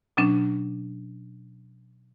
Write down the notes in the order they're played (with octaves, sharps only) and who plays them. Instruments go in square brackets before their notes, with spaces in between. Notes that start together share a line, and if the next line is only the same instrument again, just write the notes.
[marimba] B2 F#3 C#4 D4